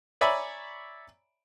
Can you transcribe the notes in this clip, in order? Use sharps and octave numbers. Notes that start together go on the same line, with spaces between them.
C#5 D5 E5 G#5 A#5 B5